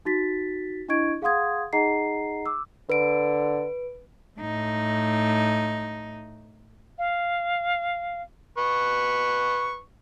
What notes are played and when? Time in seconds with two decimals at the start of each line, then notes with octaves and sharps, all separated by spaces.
0.05 D#4 F#4 A6 B6
0.89 D4 E4 D#5 C#6 G#6 D7
1.22 G#4 F5 F#5 C6 D#6 G#6
1.73 D#4 G#4 D#5 F#5 A#5 C7
2.46 D6 E6
2.90 D3 B4 D7
4.40 A2 D#4
6.98 F5
8.58 B4 C#6